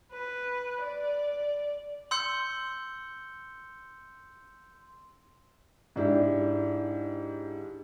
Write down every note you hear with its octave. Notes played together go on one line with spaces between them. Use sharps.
B4
D5
C6 E6 G6 C#7 G7
G#2 D4 E4 G4